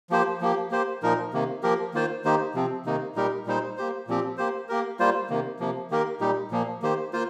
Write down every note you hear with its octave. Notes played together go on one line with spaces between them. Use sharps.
F3 A#3 G4 C5
F3 A#3 G4
A#3 G4 C5
A#2 F3 D#4 A#4
C3 D#3 A#3
F3 A#3 G4 A#4
D#3 A#3 F4 C5
D#3 A#3 D#4 G4 C5
C3 F3 C4
C3 D#3 A#3 D#4
A#2 G3 D#4 G4 A#4
A#2 G3 D#4 C5
A#3 G4 C5
A#2 F3 C4 G4
A#3 G4 C5
A#3 G4 A#4
G3 A#3 F4 C5
C3 D#3 A#3
C3 F3 A#3
D#3 A#3 G4 A#4
A#2 G3 D#4 G4
A#2 F3 A#3
D#3 A#3 G4 C5
A#3 F4 C5